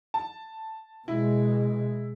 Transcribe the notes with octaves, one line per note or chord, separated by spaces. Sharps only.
A5
B2 G#3 E4